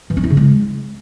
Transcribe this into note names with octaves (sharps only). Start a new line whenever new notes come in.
E3
C#4
E4
C#3
G#3